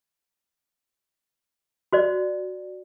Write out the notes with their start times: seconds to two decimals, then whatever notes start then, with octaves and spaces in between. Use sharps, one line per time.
1.93 F#4 C5 D5